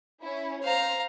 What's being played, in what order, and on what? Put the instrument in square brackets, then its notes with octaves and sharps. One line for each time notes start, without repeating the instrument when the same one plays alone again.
[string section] C#4 E4
[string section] C5 [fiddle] F5 A#5